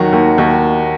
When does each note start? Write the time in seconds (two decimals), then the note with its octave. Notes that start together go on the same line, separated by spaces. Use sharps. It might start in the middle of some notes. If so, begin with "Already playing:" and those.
Already playing: D#2 D#3 F#3 F#4
0.12 D#2
0.38 D#2